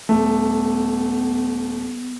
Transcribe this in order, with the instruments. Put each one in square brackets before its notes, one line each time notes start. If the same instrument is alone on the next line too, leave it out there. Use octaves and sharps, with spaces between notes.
[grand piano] D#1 A3 [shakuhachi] B3